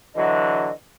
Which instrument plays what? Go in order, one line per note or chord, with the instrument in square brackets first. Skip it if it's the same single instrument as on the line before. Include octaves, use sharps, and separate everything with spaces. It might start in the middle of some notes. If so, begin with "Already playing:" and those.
[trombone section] D3 E3 F#3 [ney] D#5